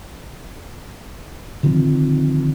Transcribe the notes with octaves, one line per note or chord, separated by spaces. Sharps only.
D3 D#3 F3 C4